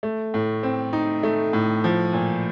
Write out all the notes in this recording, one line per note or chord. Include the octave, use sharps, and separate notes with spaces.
A3
A2
C4
D#4
A3
A2
F3
A#2